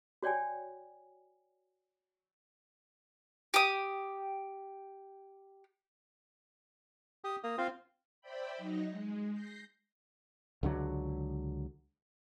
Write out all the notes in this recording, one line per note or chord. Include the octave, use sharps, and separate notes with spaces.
F#4 C#5 D5 G5 G#5
G4 D#6
G4 D#6
A#3 D#6
C4 F4 F5
C5 D5 E5 G5 B5
F#3 D#4 D#5
G#3
G6 A#6 C7
C#2 D3 D#3 F#3